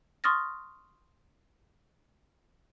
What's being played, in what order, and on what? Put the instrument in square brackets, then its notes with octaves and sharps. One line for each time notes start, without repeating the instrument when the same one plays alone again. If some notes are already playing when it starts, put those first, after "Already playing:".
[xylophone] C6 C#6 D#6 F6 A6 A#6